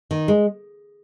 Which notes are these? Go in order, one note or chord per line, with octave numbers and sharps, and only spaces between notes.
D#3
G#3